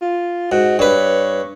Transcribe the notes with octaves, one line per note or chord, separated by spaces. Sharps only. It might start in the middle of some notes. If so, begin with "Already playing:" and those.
F4
G#2 F#4
G2 B4 C#5